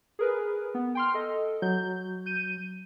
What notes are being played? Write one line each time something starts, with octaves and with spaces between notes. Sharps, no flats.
G#4 A#4 B4
B3
G5 C6 F6
A4 D#5
F#3 G6
G6 D#7